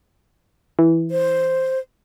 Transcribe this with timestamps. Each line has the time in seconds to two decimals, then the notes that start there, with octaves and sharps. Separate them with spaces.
0.79 E3
1.11 C5